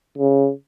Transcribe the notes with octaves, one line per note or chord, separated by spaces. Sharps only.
C#3